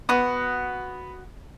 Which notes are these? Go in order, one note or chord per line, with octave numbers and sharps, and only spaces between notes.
B3 F#4 D#6